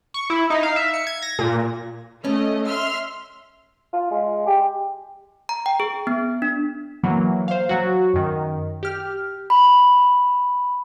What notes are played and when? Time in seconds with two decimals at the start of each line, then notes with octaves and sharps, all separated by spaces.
0.14 C#6
0.30 E4
0.50 D#4
0.63 F5
0.76 E5
0.94 C#7
1.07 G#6
1.22 A#6
1.39 A#2
2.25 A3 C#4 D#5
2.67 E5 C6 F6
3.93 F4
4.11 G#3
4.47 G4
5.49 A#5
5.66 G5
5.80 G#4
6.07 B3
6.42 D4
7.03 E3 F#3 A#3
7.48 C5 F5
7.69 F#3 F#4
8.14 F#2 D#3
8.83 G4 F6
9.50 B5